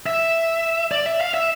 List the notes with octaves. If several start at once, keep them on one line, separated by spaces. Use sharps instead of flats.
E5
D5
E5
F5
E5